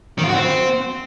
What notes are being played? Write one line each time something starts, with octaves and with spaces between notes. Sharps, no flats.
D#3
F4
F#4
C4